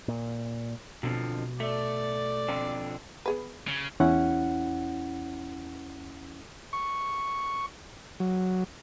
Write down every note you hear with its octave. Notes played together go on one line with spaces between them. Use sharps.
A#2
F2 B2 D3 F3
A3 D5
F2 D3 C4
B3 G#4 B4
C#3
E2 C#4 E4 F#5
C#6
F#3